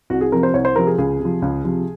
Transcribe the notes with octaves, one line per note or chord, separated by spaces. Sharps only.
C2 F#4
G#4
C3 F3 C4 A#4
C5
C2 C#5
C5
C3 F3 C4 A#4
G#4
C#2 G#4
C3
F3
C#2
C3 F3